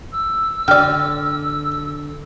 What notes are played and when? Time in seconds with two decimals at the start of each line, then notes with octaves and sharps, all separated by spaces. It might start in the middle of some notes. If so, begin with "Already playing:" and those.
0.11 E6
0.68 D3 D5 G5 F6